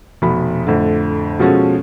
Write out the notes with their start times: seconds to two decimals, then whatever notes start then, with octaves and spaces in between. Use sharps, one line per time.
0.22 F1 B2 B5
0.67 F2 A2 D3
1.39 B2 F3 G#3 C#4 F#4 A4